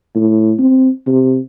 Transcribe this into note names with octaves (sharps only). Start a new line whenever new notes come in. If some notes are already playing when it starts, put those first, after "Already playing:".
A2
C4
C3